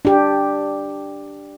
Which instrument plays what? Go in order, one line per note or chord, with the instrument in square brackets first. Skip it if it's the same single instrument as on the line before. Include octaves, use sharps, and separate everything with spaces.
[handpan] D4 G4